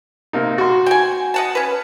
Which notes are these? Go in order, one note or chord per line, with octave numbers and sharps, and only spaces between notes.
C3 A#3 D#4
F#4 C6
G5 G#5
D#5 F#5 A5
C#4 B4